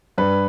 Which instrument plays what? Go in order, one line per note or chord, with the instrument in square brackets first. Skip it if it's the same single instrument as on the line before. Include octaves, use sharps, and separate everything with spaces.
[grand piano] G2 B4